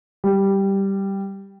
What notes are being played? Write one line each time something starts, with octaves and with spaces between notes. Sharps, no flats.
G3